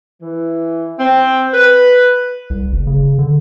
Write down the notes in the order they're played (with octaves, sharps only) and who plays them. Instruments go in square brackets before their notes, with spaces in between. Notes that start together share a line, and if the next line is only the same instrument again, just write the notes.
[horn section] E3
C4
B4
[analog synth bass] C2
F#1
C#3
D3